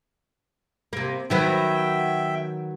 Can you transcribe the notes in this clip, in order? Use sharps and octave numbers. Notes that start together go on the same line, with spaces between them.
C3 A#3
D#3 F#3 B3 E5 G5